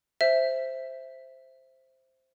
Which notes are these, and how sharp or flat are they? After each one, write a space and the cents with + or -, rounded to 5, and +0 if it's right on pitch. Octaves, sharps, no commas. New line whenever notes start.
C5 +0 E5 +0